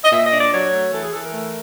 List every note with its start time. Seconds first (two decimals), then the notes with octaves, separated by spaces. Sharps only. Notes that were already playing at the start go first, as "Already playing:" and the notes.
0.04 D#5
0.12 A#2 E5
0.25 D#5
0.32 D4
0.39 D5
0.52 F#3 C#5
0.72 A3
0.93 E3 A4
1.03 G#4
1.13 E3 A4
1.23 A#4
1.33 A3